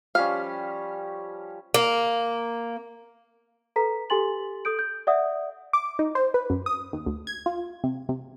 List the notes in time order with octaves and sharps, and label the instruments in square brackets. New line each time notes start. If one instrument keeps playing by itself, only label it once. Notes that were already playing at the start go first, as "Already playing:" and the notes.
[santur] F3 G3 C#4 [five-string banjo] F5
[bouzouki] A#3
[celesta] A4 B4 A#5 B6
G4 A4 G#5 C6 A6 F#7
A4 D#6 G6 D7
G6
D5 E5 F#5 D#6
[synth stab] D6
D#4
C5
B4
F#2
D#6
D#2
D2
G#6
F4
C3
C3